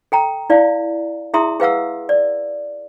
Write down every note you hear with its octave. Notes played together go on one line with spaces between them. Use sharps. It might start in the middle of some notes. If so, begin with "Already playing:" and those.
A4 G5 A#5
E4 D5 F5
E4 G#4 E5 A#5 C6 D#6
G#4 B4 F5 F#5 E6
D5